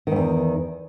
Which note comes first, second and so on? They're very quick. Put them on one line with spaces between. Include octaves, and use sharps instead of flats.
D#3 G2 E2